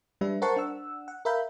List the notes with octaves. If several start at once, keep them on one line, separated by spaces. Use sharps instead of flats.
G3 D4 B4 E5
A#4 C5 F#5 A5 C6 C#6
D4 F#5 E6
F#5
A#4 E5 F5 B5 G6